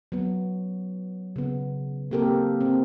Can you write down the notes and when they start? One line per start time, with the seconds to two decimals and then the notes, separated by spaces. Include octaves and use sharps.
0.12 F#3 B3
1.36 C#3 B3
2.11 A#3 C4 G4 A4 A#4
2.61 C4